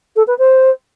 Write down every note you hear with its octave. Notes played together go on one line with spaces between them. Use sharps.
A4
B4
C5